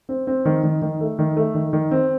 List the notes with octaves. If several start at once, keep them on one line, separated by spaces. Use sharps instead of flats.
C4
C4
D#3
D#3
D#3
A3
D#3
A3
D#3
D#3
C4